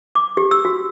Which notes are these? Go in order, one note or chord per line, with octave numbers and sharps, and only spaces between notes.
D6
G4
E6
F#4